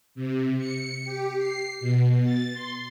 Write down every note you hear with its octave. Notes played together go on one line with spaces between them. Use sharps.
C3
C#7
G4
C7
B2
A6
C6